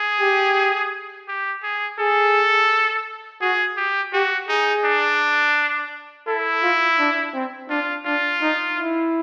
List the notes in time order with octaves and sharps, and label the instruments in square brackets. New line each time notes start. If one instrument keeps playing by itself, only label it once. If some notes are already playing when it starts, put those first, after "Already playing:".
Already playing: [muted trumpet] G#4
[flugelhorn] G4
[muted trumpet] G4
G#4
[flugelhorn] G#4 [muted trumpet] A4
[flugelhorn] F#4 [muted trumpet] G#4
[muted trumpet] G4
[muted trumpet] F#4 [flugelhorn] G4
[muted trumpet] D#4 [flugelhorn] G#4
[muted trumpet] D4
[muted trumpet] E4 [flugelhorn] A4
[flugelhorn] F4
D4
C4
[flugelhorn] D4 [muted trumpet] F4
[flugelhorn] D4 [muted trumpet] F4
[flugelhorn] D#4
E4